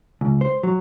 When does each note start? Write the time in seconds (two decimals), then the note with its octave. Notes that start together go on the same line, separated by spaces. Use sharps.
0.21 C#2
0.41 C5
0.63 F#3